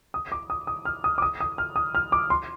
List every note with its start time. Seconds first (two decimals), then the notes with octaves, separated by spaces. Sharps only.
0.14 D#6
0.32 D6
0.50 D#6
0.67 D#6
0.85 F6
1.04 D#6
1.18 D6
1.22 D#6
1.40 D#6
1.58 F6
1.76 D#6
1.95 F6
2.12 D6
2.30 C6